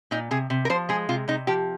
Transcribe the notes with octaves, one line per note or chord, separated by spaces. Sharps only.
A#2 D#4
C3 G#4
C3
A#4
F3 C5
G#3 G#4
C3 F4
C3 D#4
F3 G4